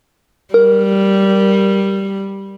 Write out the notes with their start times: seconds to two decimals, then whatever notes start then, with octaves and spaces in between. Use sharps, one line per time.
0.54 G3 A#4